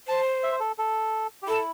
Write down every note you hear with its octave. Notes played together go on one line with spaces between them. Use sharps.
C5 A5
E5
C5
A4
A4
G4
E4 A4